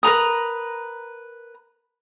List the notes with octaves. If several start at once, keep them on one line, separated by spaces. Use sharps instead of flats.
A#4 B4 A#5 D#6